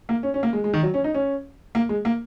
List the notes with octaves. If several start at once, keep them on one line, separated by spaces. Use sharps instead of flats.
A#3
C#4
C#4
A#3
G#3
G#3
D#3
F#3
C#4
D#4
C#4
A#3
G#3
A#3